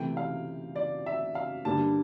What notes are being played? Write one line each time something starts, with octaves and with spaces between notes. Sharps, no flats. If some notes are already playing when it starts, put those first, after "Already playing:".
Already playing: C3 E3 A3 G5
F5
D5
E5
F5
G2 D3 G3 A#3 A5